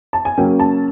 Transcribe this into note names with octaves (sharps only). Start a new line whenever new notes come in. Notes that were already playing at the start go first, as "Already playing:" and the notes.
A5
G#5
C#3 F#3 A#3 C#4 G5
A5